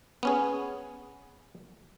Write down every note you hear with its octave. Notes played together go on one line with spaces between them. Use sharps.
B3 C#4 G#4